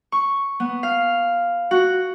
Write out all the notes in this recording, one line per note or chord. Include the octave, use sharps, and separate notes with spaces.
C#6
B3
F5
F#4